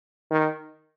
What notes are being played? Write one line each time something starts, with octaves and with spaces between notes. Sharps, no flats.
D#3